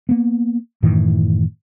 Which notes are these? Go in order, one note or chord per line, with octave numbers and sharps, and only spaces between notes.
A#3 B3
F#2 A2 D#3 E3